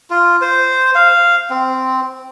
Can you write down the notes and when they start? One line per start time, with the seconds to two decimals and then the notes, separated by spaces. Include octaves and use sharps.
0.10 F4
0.42 C5
0.95 F5
1.50 C4